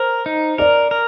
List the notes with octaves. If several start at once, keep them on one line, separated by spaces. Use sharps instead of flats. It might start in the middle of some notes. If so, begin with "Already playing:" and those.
Already playing: A#4 C5
D#4
A#4 D5
A#4